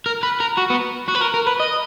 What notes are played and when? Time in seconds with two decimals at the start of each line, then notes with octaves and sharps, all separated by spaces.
0.06 A#4
0.23 B4
0.40 A#4
0.57 F#4
0.70 B3
1.08 F#4
1.15 B4
1.21 A#4
1.34 A#4
1.47 B4
1.60 D#5